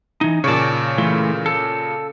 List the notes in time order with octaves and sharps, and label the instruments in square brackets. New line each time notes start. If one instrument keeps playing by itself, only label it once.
[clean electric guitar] E3 D#4
[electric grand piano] A#2 C#3 [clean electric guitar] C#5 D5 A5
[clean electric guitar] E3 A3 F4
A4